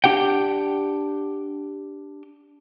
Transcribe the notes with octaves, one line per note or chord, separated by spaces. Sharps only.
D4 G4 F#5 G5